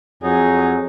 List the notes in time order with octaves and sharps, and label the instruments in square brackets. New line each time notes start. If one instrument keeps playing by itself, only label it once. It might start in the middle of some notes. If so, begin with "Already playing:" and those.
[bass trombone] F2 [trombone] F#3 [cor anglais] D#4 [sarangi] G#4